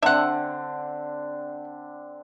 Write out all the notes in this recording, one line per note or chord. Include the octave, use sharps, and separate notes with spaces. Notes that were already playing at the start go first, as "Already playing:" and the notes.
D3 C4 D4 E5 F#5